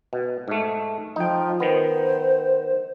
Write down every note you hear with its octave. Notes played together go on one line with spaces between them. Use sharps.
B2
G#2 A3
F3 D#4 G5
D#3 B3 C5